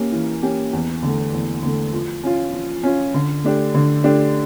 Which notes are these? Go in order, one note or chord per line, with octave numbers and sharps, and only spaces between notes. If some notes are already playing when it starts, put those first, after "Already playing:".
Already playing: A#3 C#4 G4
E3
A#3 C#4 G4
E2
D3 A3
E2
D3 A3
F3
C#4 F4
F3
C#4 F4
D3
A3 D4 G4
D3
A3 D4 G4